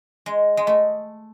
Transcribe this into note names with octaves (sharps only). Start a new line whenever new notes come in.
G#3
G#3
A3